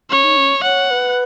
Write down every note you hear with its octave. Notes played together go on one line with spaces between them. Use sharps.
C#4 C#5
D#4
C#4
C#5 F#5
B4